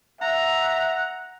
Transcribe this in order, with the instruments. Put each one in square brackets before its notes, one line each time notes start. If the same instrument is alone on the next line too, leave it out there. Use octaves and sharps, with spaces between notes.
[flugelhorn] E5 [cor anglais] F#5 [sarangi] A#5